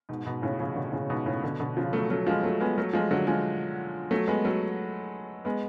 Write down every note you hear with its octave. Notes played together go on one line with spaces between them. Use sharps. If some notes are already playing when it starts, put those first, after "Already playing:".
G#2 B2
G#2 B2
A2 C#3
C#3 F3
B2 D3
A2 C#3
G#2 B2
A2 C#3
B2 D3
B2 D3
C#3 F3
F#3 A3
F#3 A3
F3 G#3
F#3 A3
G#3 B3
F#3 A3
F3 G#3
D3 F#3
F3 G#3
F#3 A3
G#3 B3
F#3 A3
G#3 B3